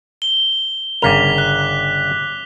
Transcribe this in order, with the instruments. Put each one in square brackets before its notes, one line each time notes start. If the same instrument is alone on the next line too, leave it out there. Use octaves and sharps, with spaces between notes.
[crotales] G7
[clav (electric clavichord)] G1 C#3 A#4 [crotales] D6 B6 F7
[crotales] F#6